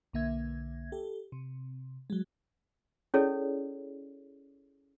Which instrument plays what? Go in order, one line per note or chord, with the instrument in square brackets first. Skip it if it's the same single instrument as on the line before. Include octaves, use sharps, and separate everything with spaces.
[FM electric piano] B1 D3 A#3 E5 G#6
G4 A4
C3
F#3 G#3
[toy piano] C#4 E4 G#4 A4 C#5 D5